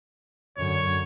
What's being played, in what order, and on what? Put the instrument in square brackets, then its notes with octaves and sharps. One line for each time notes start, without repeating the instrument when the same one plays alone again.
[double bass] F#2 D3 [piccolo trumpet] C#5